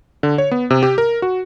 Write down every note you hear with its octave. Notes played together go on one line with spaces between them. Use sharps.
D3
C#5
B3
C3
G4
A#4
F#4